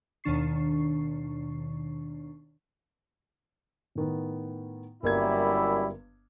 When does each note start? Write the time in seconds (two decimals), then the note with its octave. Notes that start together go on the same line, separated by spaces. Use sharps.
0.24 D#2 B2 D#3 D4 C#6 C7
3.95 A2 D#3 B3
5.03 G1 F#2 G3 A#3 E4 G#6